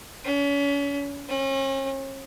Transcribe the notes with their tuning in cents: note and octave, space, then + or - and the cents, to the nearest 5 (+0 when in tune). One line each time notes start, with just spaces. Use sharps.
C#4 +35
C#4 -40